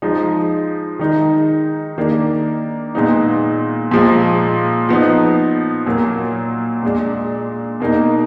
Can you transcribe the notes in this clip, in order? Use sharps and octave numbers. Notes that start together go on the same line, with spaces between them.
F3 G#3 D#4
D#3 G#3 D#4
D#3 A#3 D4
A#2 G#3 B3 D#4
A#2 F3 G#3
F3 B3 D#4
A#2 F#3 A#3
A#2 G#3 D4
B2 A#3 D#4